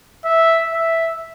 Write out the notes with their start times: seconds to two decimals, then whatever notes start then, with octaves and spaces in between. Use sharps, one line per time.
0.25 E5
0.73 E5